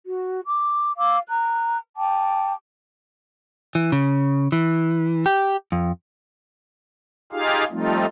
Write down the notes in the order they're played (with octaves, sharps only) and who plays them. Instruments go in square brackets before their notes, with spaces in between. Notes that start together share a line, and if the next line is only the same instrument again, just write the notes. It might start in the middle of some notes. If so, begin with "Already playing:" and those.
[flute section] F#4
D6
F5 D6 E6
A#5 F#6
G5 A5 D6
[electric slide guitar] E3
C#3
E3
G4
F2
[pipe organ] D#4 F4 G4 G#4 F5
F3 G3 A3 C4 D#4 F4